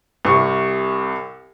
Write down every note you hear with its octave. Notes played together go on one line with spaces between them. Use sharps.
C2 C3 C#6